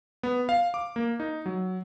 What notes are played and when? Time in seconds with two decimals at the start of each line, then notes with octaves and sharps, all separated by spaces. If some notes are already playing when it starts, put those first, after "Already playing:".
0.23 B3
0.49 F5
0.74 D6
0.96 A#3
1.20 D#4
1.46 F#3